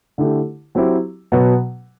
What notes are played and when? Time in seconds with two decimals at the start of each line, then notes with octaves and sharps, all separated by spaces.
0.18 D3 A3 E4 G4
0.75 F#3 C4 E4 G4
1.32 B2 F#3 B3